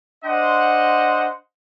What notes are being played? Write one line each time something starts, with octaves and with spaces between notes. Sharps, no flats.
D4 C5 D#5 F#5 C6